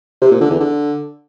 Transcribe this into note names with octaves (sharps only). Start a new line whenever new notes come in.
C3
A#2
D3
E2
D3